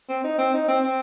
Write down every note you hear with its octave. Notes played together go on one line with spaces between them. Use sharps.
C4
D#4
C4
D#4
C4
C4